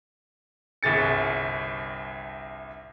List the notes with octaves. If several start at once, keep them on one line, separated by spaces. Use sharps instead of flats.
G1 C2 G#4 A6 C#7